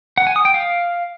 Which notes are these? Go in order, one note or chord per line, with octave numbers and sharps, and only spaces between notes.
F#5
G#5
D#6
G5
F5